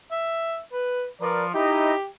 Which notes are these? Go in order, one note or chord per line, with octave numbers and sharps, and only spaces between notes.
E5
B4
F3 A#4 B4 D5
D#4 E4 G4 D#5